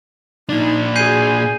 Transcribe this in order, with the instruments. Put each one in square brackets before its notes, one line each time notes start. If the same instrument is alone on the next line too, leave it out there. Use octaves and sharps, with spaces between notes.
[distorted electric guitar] A#2 D4 [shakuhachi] D#4
[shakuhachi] F#4 [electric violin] G#4 G#5 [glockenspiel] G6 C7 D#7